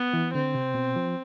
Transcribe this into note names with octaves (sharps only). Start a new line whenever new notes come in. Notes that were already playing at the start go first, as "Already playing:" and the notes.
Already playing: B3
E3
D3 C4
C3
B2
F3